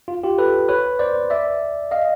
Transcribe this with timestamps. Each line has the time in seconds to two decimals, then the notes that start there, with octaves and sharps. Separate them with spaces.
0.08 F4
0.23 F4 G4
0.38 A4 B4
0.69 B4 C#5
0.99 C5 D5
1.30 D5 E5
1.91 D#5 F5